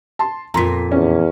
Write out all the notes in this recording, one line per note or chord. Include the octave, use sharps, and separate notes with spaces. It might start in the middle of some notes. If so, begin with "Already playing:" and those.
A5 C6
F2 A#2 A#5 C6 B6
E2 C#4